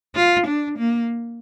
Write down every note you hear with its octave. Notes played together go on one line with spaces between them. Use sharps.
F4
D4
A#3